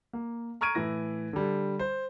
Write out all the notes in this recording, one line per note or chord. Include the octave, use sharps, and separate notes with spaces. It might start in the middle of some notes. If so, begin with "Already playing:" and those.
A#3
A#5 C#6 F6 G#6 D7 D#7
A2 E3 E4 A#6
D3 G3
C5